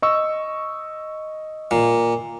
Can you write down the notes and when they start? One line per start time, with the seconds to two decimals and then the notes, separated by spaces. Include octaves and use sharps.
0.02 D#5 C#6 E6
1.71 A#2